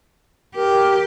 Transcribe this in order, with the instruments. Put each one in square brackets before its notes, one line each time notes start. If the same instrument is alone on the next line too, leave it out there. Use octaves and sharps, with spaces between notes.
[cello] G4 [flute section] A#4